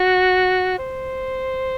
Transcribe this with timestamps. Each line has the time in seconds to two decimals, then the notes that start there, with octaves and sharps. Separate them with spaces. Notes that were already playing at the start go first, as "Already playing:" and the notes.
Already playing: F#4
0.79 C5